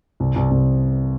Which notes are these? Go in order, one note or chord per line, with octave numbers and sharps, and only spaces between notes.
C2
C2
C2